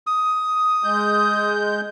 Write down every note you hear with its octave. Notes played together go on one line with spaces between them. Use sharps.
D#6
G#3 G6